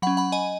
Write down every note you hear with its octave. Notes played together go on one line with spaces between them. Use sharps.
F#3 C#4 F#5 B5
F#5 B5
D#5 G#5